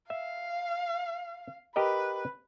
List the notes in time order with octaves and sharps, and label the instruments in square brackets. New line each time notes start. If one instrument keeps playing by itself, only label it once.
[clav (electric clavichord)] E5 [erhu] F5
[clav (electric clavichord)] G4 A#4 D#5 [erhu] B4